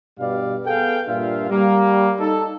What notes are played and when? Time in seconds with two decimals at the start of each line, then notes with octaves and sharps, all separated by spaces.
0.19 G2 B2 G3 D5 F5
0.66 B3 G#4 A4 F5 G5
1.08 G2 A#2 D4 F4 E5 F5
1.50 G3 A#3
2.20 D#4 A4